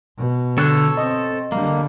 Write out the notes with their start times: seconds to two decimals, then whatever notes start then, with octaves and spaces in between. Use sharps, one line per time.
0.18 B2
0.58 D3 A4 C#5
0.97 C4 D#5
1.52 D3 G3 A#3